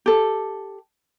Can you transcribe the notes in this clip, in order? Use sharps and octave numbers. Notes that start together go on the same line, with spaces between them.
G4 A4